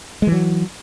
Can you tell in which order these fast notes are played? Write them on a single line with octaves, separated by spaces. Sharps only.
G#3 E3 F#3